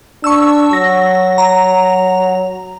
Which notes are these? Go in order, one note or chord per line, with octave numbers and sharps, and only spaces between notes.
D4 C#6 E6
F#3 A#6
A#5